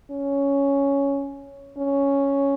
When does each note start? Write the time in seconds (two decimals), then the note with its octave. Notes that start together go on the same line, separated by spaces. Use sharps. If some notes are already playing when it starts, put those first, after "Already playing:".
0.11 C#4
1.78 C#4